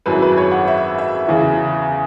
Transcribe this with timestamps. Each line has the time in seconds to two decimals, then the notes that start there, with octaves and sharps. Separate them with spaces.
0.06 G#1 F#2 F#3 E4 B4
0.22 B4
0.37 C#5
0.52 F#5
0.68 E5
0.98 E5
1.28 E2 C#3 E3